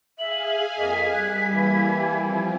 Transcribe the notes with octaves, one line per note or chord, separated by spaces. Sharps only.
G#4 E5 F5 G#5 F#7
F2 A#3 D#5 B6
G3 G#5 F#6
E3 A#3 E4
F3 C4